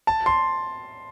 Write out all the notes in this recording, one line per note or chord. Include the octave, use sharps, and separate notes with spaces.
A5
C6